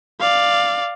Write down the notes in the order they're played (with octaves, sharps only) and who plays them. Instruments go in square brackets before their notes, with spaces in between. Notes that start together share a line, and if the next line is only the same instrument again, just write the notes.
[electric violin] D5 F5